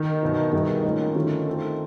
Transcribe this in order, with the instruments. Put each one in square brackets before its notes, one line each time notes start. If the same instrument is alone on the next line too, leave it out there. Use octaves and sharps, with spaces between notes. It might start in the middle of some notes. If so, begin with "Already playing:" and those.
Already playing: [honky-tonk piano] D#3
[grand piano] B2 F#3 B3 E4
[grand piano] B2 G3 B3 E4 G#4 [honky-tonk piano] D#3
[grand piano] A2 F#3 A#3 C#4 F4
[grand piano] D3 F3 A3 C#4 F4 [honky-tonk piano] D#3
[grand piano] A3 C4 F4 A4